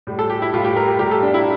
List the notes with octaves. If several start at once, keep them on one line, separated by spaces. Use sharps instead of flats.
A2 G3
A4
G4
E4
A2 G3 F4
G4
A#4
G4
A2 G3 G4
A4
D4
E4